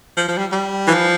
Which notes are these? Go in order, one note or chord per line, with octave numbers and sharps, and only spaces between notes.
F3
F3
G3
G3
E3
F3